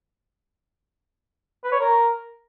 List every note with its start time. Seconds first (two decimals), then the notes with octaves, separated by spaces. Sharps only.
1.64 B4
1.72 C#5
1.80 A#4